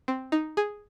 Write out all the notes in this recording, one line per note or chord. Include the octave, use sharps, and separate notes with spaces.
C4
D#4
G#4